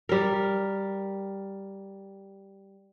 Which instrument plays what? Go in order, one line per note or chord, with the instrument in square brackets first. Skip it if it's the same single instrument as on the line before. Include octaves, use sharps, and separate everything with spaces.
[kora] G3 A#4